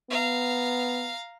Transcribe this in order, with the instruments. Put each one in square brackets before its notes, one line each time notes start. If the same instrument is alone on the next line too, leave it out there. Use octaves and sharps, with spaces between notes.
[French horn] B3 [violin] F5 A#5